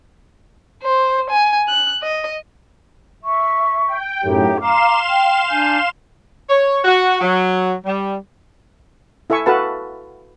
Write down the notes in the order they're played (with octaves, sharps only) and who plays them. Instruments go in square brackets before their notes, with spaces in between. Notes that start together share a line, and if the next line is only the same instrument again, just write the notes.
[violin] C5
G#5
F#6
D#5
[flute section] E5 C#6
[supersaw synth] G5
[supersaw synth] F#2 A2 [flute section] D#4 G4
[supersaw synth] F5 C6 E7 [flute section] A#5 D6
[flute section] G5
D4 G#5 G6
[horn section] C#5
F#4
F#3
G3
[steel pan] E4 A4 E5 G#5 C#6
F#4 A4 B4 F5 A5